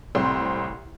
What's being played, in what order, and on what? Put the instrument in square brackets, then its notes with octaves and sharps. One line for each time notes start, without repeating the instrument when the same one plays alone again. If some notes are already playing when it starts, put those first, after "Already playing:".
[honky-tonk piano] C2 A2 C4 C5 C6